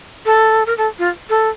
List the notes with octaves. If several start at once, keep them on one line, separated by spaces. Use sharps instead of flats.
A4
A#4
A4
F4
A4